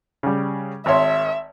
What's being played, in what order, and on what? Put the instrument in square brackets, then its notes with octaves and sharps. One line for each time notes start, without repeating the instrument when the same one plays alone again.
[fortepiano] C#3 G3
[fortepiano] G#1 C#5 C6 [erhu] E5